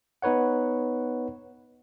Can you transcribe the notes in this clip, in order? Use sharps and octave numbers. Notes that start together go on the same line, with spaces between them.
B3 D#4 B4 C#5 F#5